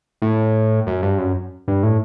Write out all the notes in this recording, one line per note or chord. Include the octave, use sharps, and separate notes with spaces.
A2
F#2
G2
F#2
G2
A2